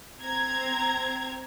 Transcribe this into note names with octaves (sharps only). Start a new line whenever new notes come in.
C4 A#5 G#6